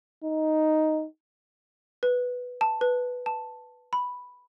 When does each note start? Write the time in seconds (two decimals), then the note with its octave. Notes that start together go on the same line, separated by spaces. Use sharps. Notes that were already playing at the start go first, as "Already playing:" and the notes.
0.24 D#4
2.03 B4
2.61 A5
2.81 B4
3.26 A5
3.93 B5